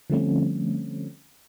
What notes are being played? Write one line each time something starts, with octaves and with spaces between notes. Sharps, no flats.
D3 F3 G3 A3 C4 C#4